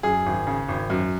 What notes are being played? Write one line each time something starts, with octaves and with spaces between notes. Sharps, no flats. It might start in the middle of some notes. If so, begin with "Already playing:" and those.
F#2 G#4
G#1
C#3
G#1
F#2